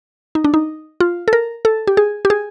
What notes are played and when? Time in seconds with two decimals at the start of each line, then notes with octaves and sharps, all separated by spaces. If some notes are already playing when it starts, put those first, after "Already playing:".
0.35 D#4
0.44 D4
0.54 D#4
1.00 F4
1.28 A4
1.33 A#4
1.65 A4
1.87 G4
1.97 G#4
2.25 G4
2.30 G#4